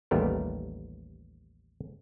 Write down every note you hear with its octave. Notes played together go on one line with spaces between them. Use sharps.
A1 D#2 G3 A3 B3 A#4